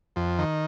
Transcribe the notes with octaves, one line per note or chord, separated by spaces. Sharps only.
F2
D#3